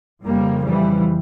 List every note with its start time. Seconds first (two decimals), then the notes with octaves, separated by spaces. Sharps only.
0.23 F2 C#3 G3 A#3
0.63 E3 G3